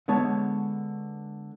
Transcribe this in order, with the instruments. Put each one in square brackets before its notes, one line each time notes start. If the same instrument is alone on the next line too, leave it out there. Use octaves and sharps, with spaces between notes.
[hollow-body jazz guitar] D3 G#3 B3 C#5 A5